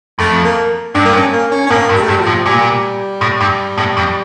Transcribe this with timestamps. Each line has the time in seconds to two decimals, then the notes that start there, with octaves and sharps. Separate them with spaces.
0.19 F2 A3
0.44 A#3
0.95 G2 D4
1.05 A#3
1.14 C#4
1.33 A#3
1.52 C#4
1.67 C#4
1.70 A2 A#3
1.89 G2
1.96 G3
2.03 A3
2.08 G2 G3
2.20 F3
2.27 A2
2.46 A#2 G3
3.21 A2
3.41 G2
3.78 A2
3.97 F2